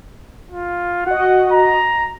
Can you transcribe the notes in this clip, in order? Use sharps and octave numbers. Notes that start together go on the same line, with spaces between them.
F4
F#4 D#5 F#5
A#5